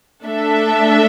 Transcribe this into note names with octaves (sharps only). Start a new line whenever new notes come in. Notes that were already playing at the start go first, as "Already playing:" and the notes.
A3 D4 A4 E5